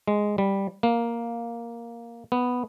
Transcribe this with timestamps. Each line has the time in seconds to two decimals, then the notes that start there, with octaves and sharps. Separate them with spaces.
0.08 G#3
0.38 G3
0.83 A#3
2.32 B3